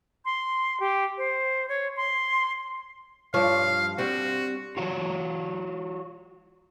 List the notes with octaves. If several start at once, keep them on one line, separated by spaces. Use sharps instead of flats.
C6
G4
C5
C#5
C6
G2 F3 C#5 F5
G3 C4 F#4
F4 F#4 C#5